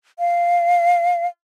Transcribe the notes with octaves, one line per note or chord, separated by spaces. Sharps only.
F5